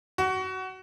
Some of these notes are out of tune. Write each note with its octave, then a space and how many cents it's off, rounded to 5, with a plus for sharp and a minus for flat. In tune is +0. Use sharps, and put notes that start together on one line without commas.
F#4 +20